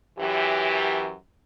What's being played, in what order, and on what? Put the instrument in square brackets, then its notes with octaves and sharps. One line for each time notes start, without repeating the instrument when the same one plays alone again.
[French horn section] F#2 E3 G4